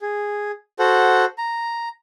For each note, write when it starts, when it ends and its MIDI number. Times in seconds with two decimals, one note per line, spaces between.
0.01 0.51 68
0.79 1.25 66
0.79 1.25 69
0.79 1.25 72
0.79 1.25 78
1.38 1.89 82